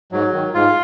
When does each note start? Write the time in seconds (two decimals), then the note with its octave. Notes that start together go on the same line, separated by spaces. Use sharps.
0.12 G#2 F#3
0.33 D#3
0.54 G#2 F4